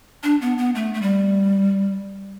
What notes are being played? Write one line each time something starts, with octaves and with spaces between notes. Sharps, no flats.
D4
B3
B3
A3
A3
G3